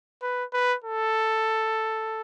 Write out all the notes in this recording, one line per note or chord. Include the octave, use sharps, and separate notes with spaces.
B4
B4
A4